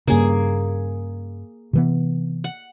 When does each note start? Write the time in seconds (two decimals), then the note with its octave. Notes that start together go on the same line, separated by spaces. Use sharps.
0.08 G2 C#3 A#3 G#4
1.73 C3 E3 B3
2.44 F#5